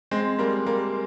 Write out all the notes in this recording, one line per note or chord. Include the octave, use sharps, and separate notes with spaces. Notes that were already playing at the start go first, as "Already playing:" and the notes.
G#3 C4
G3 A#3
G3 A#3